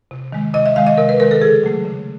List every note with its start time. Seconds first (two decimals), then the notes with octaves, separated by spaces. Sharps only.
0.11 C3
0.32 D#3 G#3
0.54 C3 D#5
0.66 E5
0.76 D#3 G#3 F5
0.87 D#5
0.98 C3 A#4
1.09 B4
1.20 D#3 G#3 A#4
1.31 A4
1.42 C#3 G#4
1.63 F#3 A3
1.85 C#3